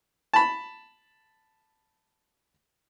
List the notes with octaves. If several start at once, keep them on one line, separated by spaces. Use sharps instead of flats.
A5 B5